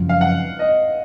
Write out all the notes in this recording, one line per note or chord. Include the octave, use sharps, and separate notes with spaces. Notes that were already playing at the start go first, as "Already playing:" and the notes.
Already playing: F#2 C#3 F3
F5
F#5
D#5